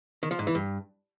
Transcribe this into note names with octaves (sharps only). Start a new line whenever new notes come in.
D#3
F3
G#2
E3
G2